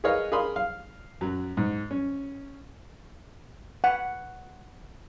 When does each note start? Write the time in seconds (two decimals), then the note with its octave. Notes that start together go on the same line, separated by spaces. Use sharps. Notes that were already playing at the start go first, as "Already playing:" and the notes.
0.04 G#4 A#4 B4 C#5 D#5 F5
0.32 G#4 A#4 F5 B5 C6 D#6
0.56 F5
1.21 F#2 F#3
1.57 G#2
1.91 C#4
3.84 F#5